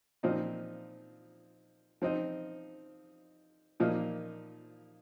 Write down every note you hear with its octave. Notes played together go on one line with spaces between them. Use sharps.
A#2 F3 C4 D#4
F3 C4 D#4
A#2 F3 A#3 D#4